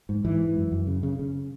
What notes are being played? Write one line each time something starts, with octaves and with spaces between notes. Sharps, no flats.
G#2
G#2 E3
G#2
F#2
F#2
C#3
C#3
C#3